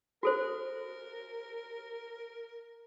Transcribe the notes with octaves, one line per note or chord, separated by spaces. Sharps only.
F#4 A4 A#4 C5